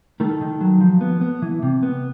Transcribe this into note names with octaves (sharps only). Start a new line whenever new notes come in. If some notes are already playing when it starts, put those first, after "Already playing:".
D#3 A3 A4
D#3
F#3
F3
B3
B3
E3
C3
B3